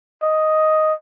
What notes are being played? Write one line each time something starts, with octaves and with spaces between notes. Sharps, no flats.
D#5